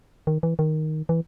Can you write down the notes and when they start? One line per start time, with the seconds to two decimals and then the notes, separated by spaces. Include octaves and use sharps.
0.27 D#3
0.43 E3
0.59 D#3
1.09 E3